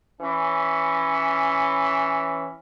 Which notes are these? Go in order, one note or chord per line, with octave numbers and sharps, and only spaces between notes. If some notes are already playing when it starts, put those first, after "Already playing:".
E3 C#4